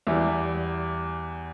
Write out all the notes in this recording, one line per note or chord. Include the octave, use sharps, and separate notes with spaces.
E2 E3 G3 E5